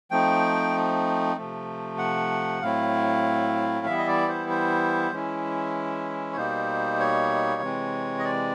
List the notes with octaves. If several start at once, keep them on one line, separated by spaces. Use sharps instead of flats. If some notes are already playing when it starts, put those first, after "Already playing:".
F3 A3 C4 D#4 G5
C3 F3 A3
F#5
A2 F#3 A3 C4 E4 F5
E3 G3 B3 E4 E5
D#5
D5
C5
C5
E3 G#3 C#4 E4
C#5
B2 G3 A#3 D#4 C5
C#5
C3 E3 G#3 C4
D#5
D5